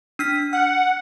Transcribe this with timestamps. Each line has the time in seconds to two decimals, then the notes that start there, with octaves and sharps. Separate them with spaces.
0.19 D4 F6 B6
0.53 F#5 F6